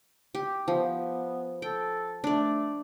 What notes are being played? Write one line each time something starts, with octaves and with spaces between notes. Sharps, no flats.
G4
F3 B3
A4 G5
A3 D4 D5